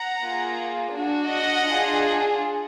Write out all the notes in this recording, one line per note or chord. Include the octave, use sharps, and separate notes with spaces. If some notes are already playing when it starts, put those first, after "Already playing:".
Already playing: F#5 A#5
A#3 F4 G#4
D4 F#4
D#5 F#5
D4 F4 G#4